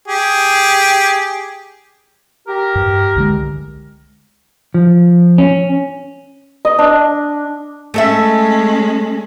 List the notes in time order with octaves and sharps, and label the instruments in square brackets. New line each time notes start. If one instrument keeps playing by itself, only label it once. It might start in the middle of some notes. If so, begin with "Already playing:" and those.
[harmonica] G4 G#4
[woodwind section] G4 A#4
[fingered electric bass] G2
C2 D3 G#3
[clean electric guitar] F3
C#4
[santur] D#5
D4
[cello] G#3 C#4 [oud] A3 A4 E5